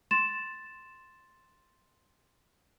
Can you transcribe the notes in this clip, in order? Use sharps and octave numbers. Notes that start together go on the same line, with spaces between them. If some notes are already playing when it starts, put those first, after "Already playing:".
C6 A6 E7